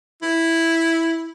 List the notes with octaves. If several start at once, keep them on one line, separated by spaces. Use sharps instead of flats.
E4